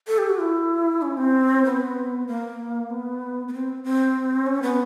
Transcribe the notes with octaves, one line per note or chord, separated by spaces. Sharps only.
A4
G4
F#4
E4
C#4
C4
B3
A#3
B3
B3
C4
C4
C#4
B3